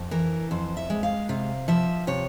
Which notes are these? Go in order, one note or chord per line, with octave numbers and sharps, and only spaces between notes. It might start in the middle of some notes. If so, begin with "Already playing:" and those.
Already playing: F2
E3 A#4
F2 C5
E5
G#3
F5
C3 F5
F3 E5
C3 C#5